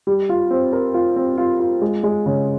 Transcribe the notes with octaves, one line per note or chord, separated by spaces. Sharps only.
G3
F4
C4
A#4
F4
C4
F4
F4
G#3
G#3
C#3